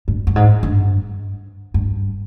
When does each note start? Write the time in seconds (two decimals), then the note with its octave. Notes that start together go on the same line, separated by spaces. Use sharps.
0.08 G2
0.27 G2
0.36 G#2
0.63 G2
1.74 G2